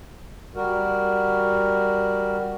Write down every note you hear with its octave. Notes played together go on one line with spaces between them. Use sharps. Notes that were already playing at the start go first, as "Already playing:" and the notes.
G3 F#4 A#4